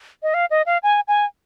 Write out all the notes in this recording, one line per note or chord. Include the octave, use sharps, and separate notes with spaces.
D#5
F5
D#5
F5
G#5
G#5